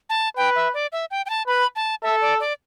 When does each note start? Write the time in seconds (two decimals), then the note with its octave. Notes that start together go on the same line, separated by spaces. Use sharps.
0.10 A5
0.37 B4 G5
0.56 E5
0.74 D5
0.92 E5
1.11 G5
1.26 G5
1.30 A5
1.47 B4 B5
1.76 A5
2.03 A4 E5
2.21 D5
2.40 D5